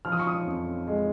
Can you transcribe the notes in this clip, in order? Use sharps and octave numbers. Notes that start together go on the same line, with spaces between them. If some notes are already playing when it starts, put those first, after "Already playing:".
F3 F6
D#6
C#6
D#6
F2
G#3